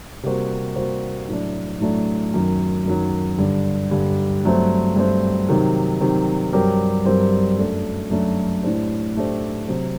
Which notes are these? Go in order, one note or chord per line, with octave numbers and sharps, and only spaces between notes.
C3 G3 A#3 F#4 C5
C3 G3 A#3 F#4 C5
A2 F#3 A3 D4
A2 F#3 A3 D4
F#2 D#3 F#3
F#2 D#3 F#3
G2 D3 G3
G2 D3 G3
G2 F#3 A3 C4
G2 F#3 A3 C4
C3 D#3 F#3
C3 D#3 F#3
G2 F#3 C4 G4 A#4
G2 F#3 C4 G4 A#4
F#2 F#3 A3 D4 A4
F#2 F#3 A3 D4 A4
A2 A3 D4 G4 C5
A2 A3 D4 G4 C5
C3 F#3 C4